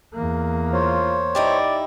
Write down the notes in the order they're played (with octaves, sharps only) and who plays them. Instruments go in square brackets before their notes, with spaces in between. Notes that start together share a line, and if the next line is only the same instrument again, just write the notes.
[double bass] E2 A#3
[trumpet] F4 [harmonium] C5 C#5
[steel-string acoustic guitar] D#4 E4 G4 [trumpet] D5